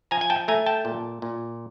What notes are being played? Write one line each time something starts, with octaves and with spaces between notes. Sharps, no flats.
F3 G#5 A#5
G#5
G5 A5
A3 G#5 A#5
G5 A5
A#2
A#2